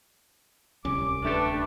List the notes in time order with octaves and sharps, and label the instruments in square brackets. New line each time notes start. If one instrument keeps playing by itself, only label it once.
[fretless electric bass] D1 C2 C#4 [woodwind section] D6
[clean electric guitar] A3 G4 A4 [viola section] D4 B4